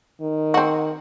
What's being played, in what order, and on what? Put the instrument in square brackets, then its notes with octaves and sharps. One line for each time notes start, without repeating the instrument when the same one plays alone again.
[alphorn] D#3
[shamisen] C4 F#4